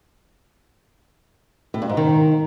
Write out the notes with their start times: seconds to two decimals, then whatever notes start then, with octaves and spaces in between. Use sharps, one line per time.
1.74 A2
1.82 G2
1.89 G#2
1.97 D#3